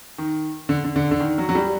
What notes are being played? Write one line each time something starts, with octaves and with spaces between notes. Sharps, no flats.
D#3
D3
D3
D3
D3
D#3
F#3
F#3
G3